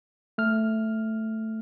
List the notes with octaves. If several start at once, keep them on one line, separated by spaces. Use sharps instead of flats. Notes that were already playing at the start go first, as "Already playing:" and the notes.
A3 F6